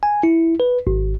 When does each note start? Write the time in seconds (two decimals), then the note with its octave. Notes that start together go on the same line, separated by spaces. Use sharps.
0.03 G#5
0.23 E4
0.60 B4
0.87 G#1